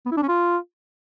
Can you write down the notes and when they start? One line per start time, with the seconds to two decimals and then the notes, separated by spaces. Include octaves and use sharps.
0.06 B3
0.12 E4
0.17 D4
0.23 C#4
0.28 F4